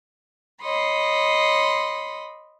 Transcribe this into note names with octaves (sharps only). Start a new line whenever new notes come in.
C#5 D#5 B5 C6